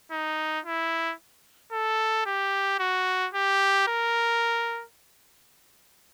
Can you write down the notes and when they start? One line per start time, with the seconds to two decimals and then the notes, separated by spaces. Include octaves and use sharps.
0.11 D#4
0.65 E4
1.73 A4
2.26 G4
2.80 F#4
3.34 G4
3.88 A#4